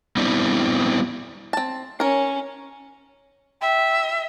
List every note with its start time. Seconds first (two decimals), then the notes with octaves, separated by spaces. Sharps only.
0.17 G3 B3 C4 D4 E4
1.53 C4 A5
2.00 C#4 A#4 C#5
3.62 E5 G5